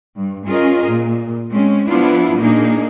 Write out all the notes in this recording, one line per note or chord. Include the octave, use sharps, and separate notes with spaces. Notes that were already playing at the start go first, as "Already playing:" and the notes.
G2
C#4 F4 G#4 A#4 D#5
A#2
G#3 C4 C#4
F3 B3 D4 E4 F4
A#2 A#3 D4 D#4 G#4